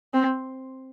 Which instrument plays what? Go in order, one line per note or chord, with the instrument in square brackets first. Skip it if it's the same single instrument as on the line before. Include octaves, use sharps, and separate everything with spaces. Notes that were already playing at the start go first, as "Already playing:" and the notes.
[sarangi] C4